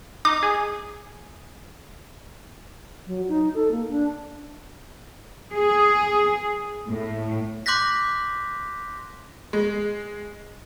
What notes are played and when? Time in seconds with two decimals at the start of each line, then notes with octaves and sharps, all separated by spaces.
0.25 D#4 D6
0.43 G#4
3.07 F#3
3.28 D#4
3.55 A4
3.71 A#3
3.90 D4
5.52 G#4
6.88 A2
7.66 C6 D6 F#6 G6 A#6 B6
9.53 G#3